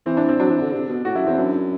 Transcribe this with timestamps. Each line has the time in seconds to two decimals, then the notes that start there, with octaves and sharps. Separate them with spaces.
0.06 E3 C4
0.17 D4
0.29 C4
0.40 F#3 D4
0.50 E3
0.61 D3
0.72 C3
0.89 B2
1.05 A2 F#4
1.15 F#2 E4
1.26 E2 C4
1.38 F#2 D4